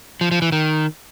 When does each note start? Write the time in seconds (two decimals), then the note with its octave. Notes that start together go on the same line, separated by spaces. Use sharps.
0.21 F3
0.31 F3
0.42 E3
0.52 D#3